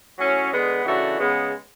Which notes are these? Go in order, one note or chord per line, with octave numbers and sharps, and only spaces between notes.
A2 F#3 C#4
D3 G#3 B3
C#3 E3 A3 D4 F#4
C#3 G#3 B3